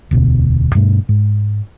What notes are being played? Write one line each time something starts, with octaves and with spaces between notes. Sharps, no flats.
E1 D2 B2
G2 B2 A3 D4
G#2